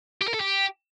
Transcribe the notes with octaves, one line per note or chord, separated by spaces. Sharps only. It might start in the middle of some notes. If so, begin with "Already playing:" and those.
G4
A#4
A4
G4